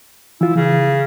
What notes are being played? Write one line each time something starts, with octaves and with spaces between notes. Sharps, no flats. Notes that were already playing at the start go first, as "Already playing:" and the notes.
E3 E4 F4
C#3 E3